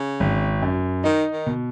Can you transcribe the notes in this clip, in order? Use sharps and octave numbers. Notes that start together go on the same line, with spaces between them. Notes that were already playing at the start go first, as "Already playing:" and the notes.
Already playing: C#3
G#1
F#2
D#3 D#4
D#3
B2